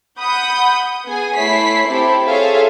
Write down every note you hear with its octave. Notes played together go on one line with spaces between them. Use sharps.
F#5 B5 D#6 G6
B3 G#4 G#5
A3 E4 C#5 B6 C7
C4 E4 G4 A4
F4 G#4 A4 C#5 E5 F5